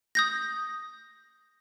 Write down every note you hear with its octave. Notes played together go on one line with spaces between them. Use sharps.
D#6 G6 A#6